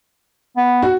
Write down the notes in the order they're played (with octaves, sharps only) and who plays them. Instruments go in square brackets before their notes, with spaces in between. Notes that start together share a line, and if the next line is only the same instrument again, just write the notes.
[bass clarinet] B3
[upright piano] F#4